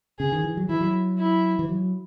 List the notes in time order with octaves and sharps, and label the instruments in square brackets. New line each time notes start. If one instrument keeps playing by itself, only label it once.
[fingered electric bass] C#3 [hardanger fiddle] G#4
[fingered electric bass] D#3
E3
F#3
[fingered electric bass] E3 [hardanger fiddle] E4
[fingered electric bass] F#3
[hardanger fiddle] E4
[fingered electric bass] E3
F#3